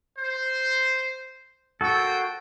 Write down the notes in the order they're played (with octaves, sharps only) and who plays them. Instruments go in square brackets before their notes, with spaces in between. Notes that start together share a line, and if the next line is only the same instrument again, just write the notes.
[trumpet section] C5
[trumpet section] A#3 C5 G5 [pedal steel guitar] F#4 A4